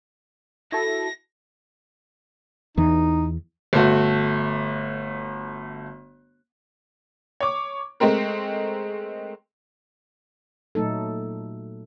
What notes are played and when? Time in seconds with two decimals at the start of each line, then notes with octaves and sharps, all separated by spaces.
0.72 E4 F#4 A4 A#6
2.77 E2 E3 D#4
3.73 G1 A3 F#4
7.41 C#5 D6
8.00 G#3 A3 C4 A#4
10.75 A#2 F#3 A3 D#4 A4